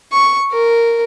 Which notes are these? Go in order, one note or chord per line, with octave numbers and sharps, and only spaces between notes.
C#6
A#4